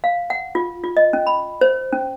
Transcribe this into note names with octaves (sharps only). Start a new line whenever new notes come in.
F5
F#5
F4
F4
D#5
C#4
B5
C5
C#4